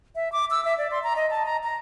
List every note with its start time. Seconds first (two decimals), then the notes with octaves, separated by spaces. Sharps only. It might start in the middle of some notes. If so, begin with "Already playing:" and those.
0.15 E5
0.32 D6
0.51 E6
0.65 E5
0.78 D5
0.92 C6
1.04 A#5
1.16 D#5
1.31 A5
1.45 A#5
1.63 A#5